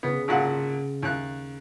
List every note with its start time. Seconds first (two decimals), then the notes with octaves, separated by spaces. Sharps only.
0.03 C#3 B3
0.28 G#1 A#2 F#5
1.02 D#2 F#6